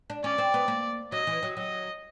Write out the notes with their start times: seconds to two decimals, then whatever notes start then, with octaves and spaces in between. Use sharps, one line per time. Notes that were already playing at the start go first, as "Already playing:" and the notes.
0.10 D4
0.24 C#4 D5
0.38 C4
0.54 B3
0.68 A#3
1.12 F#3 D#5
1.27 E3
1.43 F#3
1.57 F#3 D#5